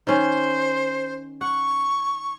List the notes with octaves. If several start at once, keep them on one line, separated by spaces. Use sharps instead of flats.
D#3 C#4 C5
F#5 C#6